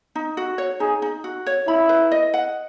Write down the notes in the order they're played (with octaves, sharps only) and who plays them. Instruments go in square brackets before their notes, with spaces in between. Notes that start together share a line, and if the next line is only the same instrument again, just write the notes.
[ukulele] D#4
F#4
C#5
[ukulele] D#4 [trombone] G#4
[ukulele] D#4
F#4
C#5
[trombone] E4 [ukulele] B5
[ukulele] B4
D#5
F#5